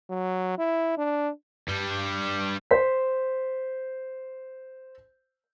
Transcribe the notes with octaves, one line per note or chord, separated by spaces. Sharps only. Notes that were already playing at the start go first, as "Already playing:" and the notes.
F#3
E4
D4
G2 G3
C5 B6